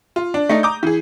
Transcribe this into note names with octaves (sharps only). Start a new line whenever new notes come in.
F4
D4
A3 D4 D#4 D#5
A#5 D6 D#6 G6
E3 G#4